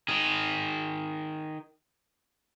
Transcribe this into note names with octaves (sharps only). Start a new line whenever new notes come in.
D#3 G#4